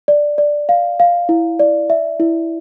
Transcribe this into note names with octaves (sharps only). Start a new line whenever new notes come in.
D5
D5
F5
F5
E4
D5
E5
E4